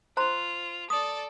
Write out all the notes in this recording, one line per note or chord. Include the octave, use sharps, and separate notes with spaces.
F4 C5 A#5 C6
A4 D5 D#6